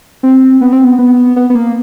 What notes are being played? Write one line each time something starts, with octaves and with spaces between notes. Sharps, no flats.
C4
B3
C4
B3
B3
B3
B3
A#3